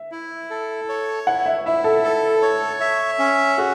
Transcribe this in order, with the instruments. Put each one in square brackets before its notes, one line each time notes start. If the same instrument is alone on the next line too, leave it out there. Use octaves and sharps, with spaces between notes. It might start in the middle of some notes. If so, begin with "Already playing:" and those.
Already playing: [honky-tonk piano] E5
[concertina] E4
A4
C#5
[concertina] E4 [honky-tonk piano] F#5
[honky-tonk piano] E5
[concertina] E4 [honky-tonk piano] E5
[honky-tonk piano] A4
[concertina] A4
C#5
E5
C#4
[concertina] F#4 [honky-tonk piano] G#4